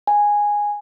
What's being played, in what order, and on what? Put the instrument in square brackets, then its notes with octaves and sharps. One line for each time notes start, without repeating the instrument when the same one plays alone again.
[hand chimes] G#5